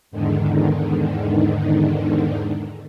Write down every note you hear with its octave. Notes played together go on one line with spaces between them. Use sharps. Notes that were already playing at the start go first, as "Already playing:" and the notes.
E2 G#2 D3 D#3